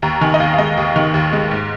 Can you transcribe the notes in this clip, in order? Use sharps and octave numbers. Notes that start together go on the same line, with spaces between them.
D#2 A#5
D#3 G#5
D#5
D#2 F5
F5
G#3 D#5
D#2
D#3
D#2
G#3
G#2